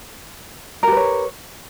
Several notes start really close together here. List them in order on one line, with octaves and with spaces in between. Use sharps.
A#4 G4 B4 C#5